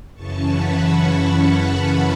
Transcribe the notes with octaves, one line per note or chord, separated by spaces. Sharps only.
F#2 C#3 E3 C#4 A5 C#6
F#5 B5
A5 C#6
F#5 B5